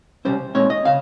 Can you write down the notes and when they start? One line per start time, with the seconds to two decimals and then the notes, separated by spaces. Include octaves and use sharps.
0.25 C3 G3 C#4 C5
0.55 A#2 G#3 C4 D#4 C#5
0.70 D#5
0.85 C#3 F5